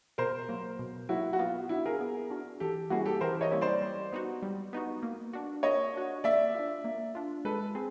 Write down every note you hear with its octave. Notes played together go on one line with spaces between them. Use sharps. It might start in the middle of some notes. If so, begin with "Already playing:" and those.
B2 A#4 C5
F#3 A#3
B2
F#3 A#3 E4 F#4
F#4
B3 F4
D4 E4 F#4
G#4 A#4
B3
D4 F#4
E3 G4 A4
G3 A#3 C#4 E4 F#4 G#4
G4 A4
E3 A#4 C5
C#5 D#5
G3 A#3 C#4 E4
C5 D5
G3
B3 D#4 F#4
G3
B3 D#4 F#4
A#3
D4 F#4
A#3 C#5 D#5
D4 F#4
A#3 D5 E5
D4 F4
A#3
D4 F4
G#3 A4 B4
C4 G#4